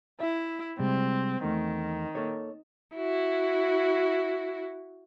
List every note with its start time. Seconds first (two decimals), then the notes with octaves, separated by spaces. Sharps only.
0.20 E4 E5
0.79 C3 G3 G#3 C4
1.44 E2 D#3 A3
2.15 A#3 A4 C#5
2.95 E4 F#4